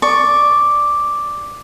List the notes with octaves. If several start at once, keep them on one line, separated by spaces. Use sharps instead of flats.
D5 C#6